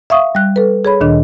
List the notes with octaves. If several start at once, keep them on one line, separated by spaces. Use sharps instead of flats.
E5 F5 C#6 D#6
G3 F#6
A4 B4
G#4 C#5 B5
D2 A#2 D#3 D4 D#5